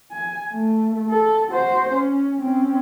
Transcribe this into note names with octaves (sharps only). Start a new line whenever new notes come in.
G#5
A3
A4
F#4 C5
C#4
C4 C#4